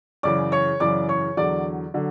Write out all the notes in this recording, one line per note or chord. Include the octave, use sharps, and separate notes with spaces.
F#2 C#3 E3 D5 D6
C#5 C#6
F#2 C#3 E3 D5 D6
C#5 C#6
E2 D3 F#3 D5 D6
D3 F#3